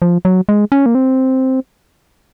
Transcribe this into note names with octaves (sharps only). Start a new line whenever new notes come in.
F3
F#3
G#3
C#4
A#3
C4